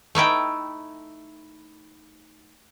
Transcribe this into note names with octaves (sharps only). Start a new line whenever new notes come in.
A3 D#4 E4 G5